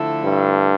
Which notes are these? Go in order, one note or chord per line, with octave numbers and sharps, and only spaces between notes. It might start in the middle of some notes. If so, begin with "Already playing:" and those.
Already playing: D3 F3 A3 E4 A4
G2